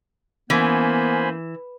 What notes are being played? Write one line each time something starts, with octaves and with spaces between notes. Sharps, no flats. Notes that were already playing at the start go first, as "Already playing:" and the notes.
E3 A#3 B3 C#4 C5 G#5 B5